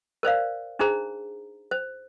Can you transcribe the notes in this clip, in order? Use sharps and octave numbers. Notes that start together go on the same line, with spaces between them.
A#4 C5 D5 F5
D4 D#4 G#4 C5 A#5
C5